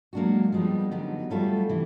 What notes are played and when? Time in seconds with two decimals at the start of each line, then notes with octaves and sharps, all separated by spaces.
0.13 F#3 G#3 A#3 D4 F#4
0.52 F3 G3 G#3 B3
0.91 D3 F#3 G3 B3 D#4
1.30 F#3 G3 A3 C#4 F4 A4
1.69 C3 E3